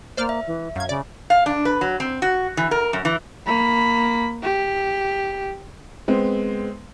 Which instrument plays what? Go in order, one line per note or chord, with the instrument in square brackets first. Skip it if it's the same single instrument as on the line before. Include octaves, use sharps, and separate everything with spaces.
[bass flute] A#3 [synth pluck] C5 D5 F6
[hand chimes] E5
[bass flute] E3
[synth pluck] F#2 G#6 [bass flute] F5
[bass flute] C#3 [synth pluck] D5
[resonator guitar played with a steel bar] F5
D4
B4
F#3
C4
F#4
E3
A#4
F#2
E3
[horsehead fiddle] A#3 B5
G4
[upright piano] G#3 B3 C4